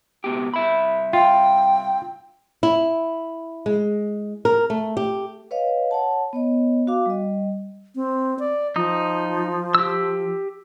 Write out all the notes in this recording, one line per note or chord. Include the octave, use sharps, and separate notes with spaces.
C#2 B2 G4
C2 E5 B5
F4 G5
E4
G#3
A#4
A3
G4
B4 C#5 D#5 F5
C#5 F#5 A5
B3 C#5 D#5
F#4 F5 D6
G3 D#5
C4
D5
F3 D#4 D#6
G4 E6